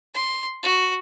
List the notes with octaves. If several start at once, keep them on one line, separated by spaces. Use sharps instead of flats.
C6
F#4